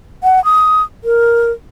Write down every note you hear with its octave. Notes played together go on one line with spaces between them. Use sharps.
F#5
D#6
A#4